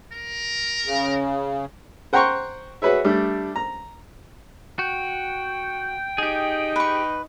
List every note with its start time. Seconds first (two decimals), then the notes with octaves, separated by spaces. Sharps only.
0.12 A#4
0.85 C#3
2.13 C5 F#5 G5 A#5 C6 C#6
2.82 F#4 G#4 B4 C#5 E5
3.04 G3 A3 D4
3.56 A#5
4.79 F#4 G5
6.18 D#4 G4 G#4
6.76 B4 C#6